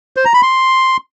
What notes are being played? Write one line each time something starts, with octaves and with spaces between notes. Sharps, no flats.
C5
A#5
B5
C6